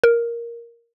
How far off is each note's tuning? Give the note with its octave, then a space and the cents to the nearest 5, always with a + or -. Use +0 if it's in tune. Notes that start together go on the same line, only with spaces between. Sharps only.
A#4 +5